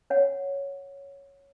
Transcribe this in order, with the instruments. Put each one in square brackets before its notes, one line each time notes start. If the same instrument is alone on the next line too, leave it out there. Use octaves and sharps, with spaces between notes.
[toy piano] C#5 F#5